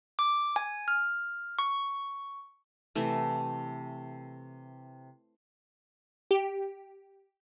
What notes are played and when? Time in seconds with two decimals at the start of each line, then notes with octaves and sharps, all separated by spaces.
0.19 D6
0.56 G#5
0.88 F6
1.59 C#6
2.95 C3 E3 A3
6.31 G4